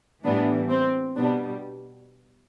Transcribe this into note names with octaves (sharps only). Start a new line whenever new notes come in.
A2 E3 G3 B3 D4
C4
B2 G3 B3 D4